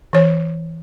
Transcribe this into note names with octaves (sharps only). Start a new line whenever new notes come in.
E3 C#5